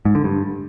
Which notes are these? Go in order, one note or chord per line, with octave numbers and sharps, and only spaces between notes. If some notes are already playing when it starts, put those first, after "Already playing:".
G#2
D3
G2